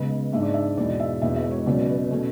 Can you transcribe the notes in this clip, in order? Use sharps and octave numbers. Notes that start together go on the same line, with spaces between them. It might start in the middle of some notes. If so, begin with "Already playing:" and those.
Already playing: C#2 C#3 G#3 B3
G#2 G#3 D4 E5
D5
E5
E2 B2 G#3 D5
E5
E1 E2 B2 G#3 B3 E5
E5
C#5
C#2 B2 F#3 B3 D5
B4
B2 A3 C#4